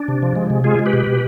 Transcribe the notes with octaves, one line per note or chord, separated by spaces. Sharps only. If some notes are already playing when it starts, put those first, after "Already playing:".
Already playing: D4
C3
F3
G#3
C3
G#3 F4 G#4
G#3
G4 B4
B2
B2